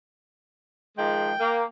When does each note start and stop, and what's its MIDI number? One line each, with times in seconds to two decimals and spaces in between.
0.98 1.32 51
0.98 1.32 53
0.98 1.32 56
0.98 1.64 79
1.40 1.63 58